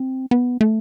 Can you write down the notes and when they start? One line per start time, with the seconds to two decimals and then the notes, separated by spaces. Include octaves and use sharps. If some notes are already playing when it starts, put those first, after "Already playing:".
Already playing: C4
0.31 B3
0.61 A3